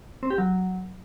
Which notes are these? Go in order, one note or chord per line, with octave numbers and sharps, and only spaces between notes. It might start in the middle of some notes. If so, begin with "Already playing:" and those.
C4
G4
F#3